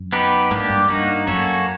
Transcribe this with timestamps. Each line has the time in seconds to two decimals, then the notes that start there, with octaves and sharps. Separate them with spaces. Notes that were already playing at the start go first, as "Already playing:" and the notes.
Already playing: F#2
0.13 B3 D#4 G4 B4
0.51 G#2 A#3 D4 G4
0.70 G2
0.89 G2 A#3 D#4 F#4
1.27 F#2 A#3 C#4 F#4 A4 C#5